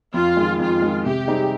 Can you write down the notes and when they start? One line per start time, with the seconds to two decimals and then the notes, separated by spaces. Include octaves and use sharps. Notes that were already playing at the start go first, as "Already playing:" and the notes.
0.13 F2 F4
0.37 D#3 G#3
0.59 F2 F4
0.82 D#3 G#3
1.05 C3 G4
1.28 G3 C4 D#4 G#4